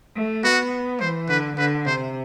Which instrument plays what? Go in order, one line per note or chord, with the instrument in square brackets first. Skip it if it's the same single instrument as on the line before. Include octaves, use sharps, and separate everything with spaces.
[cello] A3
[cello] B3 [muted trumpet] F#4
[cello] E3 [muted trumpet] C5
[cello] D3 [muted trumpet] B4
[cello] D3 [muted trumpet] B4
[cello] C3 [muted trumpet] C5